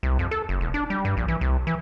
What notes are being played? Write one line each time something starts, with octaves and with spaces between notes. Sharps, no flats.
C2
F2
A4
F#1
E1
D4
G3
G2
A#1
E3
C2
E3